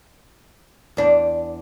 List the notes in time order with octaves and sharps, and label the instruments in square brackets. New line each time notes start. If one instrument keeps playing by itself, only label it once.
[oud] E2 D4